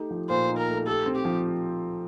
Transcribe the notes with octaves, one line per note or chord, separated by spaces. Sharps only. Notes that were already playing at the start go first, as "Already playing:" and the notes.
Already playing: A3 D#4 G4
F3
A#2 C5
D#4
A#4
A3
G4 A4
C4
G4
F3